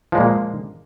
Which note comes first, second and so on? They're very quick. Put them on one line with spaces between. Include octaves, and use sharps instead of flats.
F3 G#3 A#2 A#3